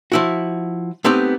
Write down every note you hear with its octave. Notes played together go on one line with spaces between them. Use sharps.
F3 E4 F#4
A3 B3 C4 D#4 G4